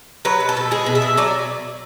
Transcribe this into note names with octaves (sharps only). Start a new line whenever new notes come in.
F#3 B4
B2
A4
B2
G#3 G#4
B2
E5
B2
F#3 D5